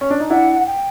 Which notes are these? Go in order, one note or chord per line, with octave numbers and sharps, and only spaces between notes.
C#4
D4
D#4
D4 E4 F#5
G5